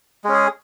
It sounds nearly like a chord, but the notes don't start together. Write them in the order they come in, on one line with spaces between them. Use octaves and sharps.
G#3 C#4 G#4